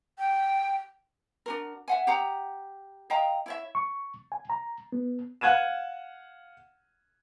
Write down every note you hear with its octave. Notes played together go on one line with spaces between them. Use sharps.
G5
D4 F#4 A#4
E5 F#5 G#5
G4 G#4 F#5 A#5
D#5 F5 G5 A#5
E4 C#5 E5
C#6
G#5
A#5
B3
F5 F#5 F#6 G#6 D#7 E7